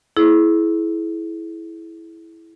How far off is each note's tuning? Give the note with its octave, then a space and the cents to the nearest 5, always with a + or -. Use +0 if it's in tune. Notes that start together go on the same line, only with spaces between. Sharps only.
E4 -5 G#4 +35